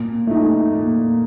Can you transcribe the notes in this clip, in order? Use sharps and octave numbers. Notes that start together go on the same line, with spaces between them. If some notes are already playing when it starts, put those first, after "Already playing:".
Already playing: A#2
A3 D#4
A#2